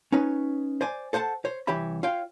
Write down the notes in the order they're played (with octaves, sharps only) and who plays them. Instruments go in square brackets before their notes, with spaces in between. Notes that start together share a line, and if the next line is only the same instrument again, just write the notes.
[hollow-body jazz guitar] C#4 D#4 B4 C#5
C5 D5 G#5
A4 C5 F#5 G#5 A5
C5 C#5
C2 E3 G4 C#5 E5 B5
F4 C#5 F5 G5